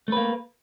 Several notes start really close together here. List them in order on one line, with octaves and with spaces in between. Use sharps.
A3 B4 A#3